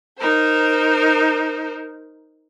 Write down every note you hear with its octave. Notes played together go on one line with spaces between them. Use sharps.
D#4 A#4 C5